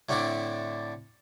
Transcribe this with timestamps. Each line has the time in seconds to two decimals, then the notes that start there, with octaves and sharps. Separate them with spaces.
0.09 A2 D3 A3 C4 D4 E4